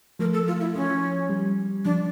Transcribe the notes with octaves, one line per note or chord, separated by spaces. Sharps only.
F3 A3 A#4
A4
F4
E4
F3 C#4
G3
F3 D4